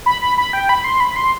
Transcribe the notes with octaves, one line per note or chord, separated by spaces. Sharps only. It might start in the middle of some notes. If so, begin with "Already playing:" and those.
B5
B5
B5
G5
B5
C6
B5
C6